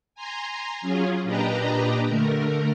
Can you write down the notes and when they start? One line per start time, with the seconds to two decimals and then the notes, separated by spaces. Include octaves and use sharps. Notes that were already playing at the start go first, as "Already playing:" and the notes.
0.15 G#5 A#5 C6
0.81 F#3 C#4 F4 G#4
1.24 A#2 D4 G4 B4 D#5 A#5
2.08 D3 A3 A#4